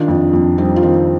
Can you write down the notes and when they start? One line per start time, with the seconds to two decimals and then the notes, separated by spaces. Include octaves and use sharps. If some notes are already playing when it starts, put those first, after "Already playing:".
Already playing: D#3 D4 F4
0.08 F2
0.33 F2
0.58 G3 C4 D#4
0.76 F4
0.83 D#3 C4 D#4